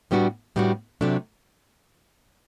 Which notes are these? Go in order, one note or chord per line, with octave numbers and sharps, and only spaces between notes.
A2 G3 B3 D4 F#4
A2 G3 B3 D4 F#4
C3 F#3 A3 D4